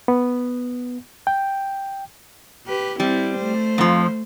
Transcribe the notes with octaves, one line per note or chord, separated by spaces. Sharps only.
B3
G5
G4 B4
G3 C4 E4
A3 C5
F2 F3